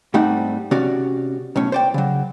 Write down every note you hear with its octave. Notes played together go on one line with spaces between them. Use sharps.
G#2 G3 A3 C4 D#4 F#5
C3 C#4 F#4 D5
B1 A2 C#4
C5 D5 G5
C#3 F#3